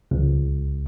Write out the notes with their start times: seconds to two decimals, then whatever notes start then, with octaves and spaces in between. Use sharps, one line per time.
0.11 C#2